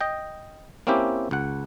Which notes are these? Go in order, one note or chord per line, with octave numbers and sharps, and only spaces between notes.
D#5 G5
A#3 C4 C#4 E4 G4
C#2 F#5